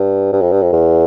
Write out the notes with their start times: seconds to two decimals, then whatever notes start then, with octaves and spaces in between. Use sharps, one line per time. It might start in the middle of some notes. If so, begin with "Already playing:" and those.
Already playing: G2
0.32 G2
0.42 F2
0.52 G2
0.62 F2
0.73 E2